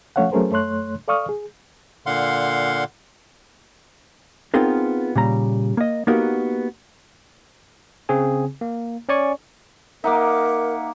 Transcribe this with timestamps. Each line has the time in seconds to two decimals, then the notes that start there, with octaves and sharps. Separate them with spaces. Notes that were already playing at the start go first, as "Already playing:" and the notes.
0.16 F3 A3 C#4 C#5 F5 F#5
0.32 F#3 A3 C#4 G#4 A#4 C5
0.51 F#2 A3 C#5 C6 F#6
1.08 A4 D5 F5 C#6 D#6 F6
1.29 G#4
2.06 A#2 D3 F5 F#5 C6
4.54 B3 C4 D#4 F4 G#4 A#4
5.16 A#2 C#3 G3 A#5
5.77 A#3 D#5
6.07 A#3 B3 D#4 F#4 G4 A#4
8.09 C#3 C4 G#4 G#5
8.61 A#3
9.09 C#4 C#5 D5 G#5 C#6
10.04 A#3 D#4 A#4 E5 F#5 D6